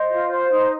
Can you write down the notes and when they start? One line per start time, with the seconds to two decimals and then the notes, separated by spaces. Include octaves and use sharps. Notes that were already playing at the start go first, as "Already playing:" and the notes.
Already playing: C5 D#5
0.09 F4
0.29 C5
0.49 D#4